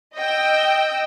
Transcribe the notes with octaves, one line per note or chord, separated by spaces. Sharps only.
D#5 G5 E6